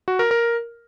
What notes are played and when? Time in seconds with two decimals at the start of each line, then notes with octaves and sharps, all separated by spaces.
0.08 F#4
0.19 A#4
0.31 A#4